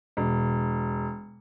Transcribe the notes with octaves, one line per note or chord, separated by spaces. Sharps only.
E1